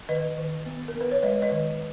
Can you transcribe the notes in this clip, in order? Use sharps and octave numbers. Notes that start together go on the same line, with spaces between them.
D#3 B4 D#5
D#3
B3
A#4
B3
B4
C#5
G#3 B4 D#5
B4 D#5
D#3